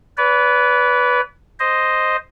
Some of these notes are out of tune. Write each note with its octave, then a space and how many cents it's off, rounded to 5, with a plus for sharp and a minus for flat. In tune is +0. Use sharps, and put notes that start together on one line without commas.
B4 +0 D5 -40
C5 +0 D#5 +0